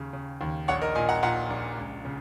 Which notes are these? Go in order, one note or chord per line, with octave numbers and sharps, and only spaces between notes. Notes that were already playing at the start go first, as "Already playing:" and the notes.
Already playing: D#2 C#3
C#3
D#2
A#1 C#5 F#5
A#4 D#5
A#2 D#5 G#5
F#5 A#5
A#2 F#5 A#5
A#1
C#2
C#3